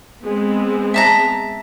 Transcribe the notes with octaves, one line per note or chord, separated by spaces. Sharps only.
G#3 B3 C4
E5 A5 A#5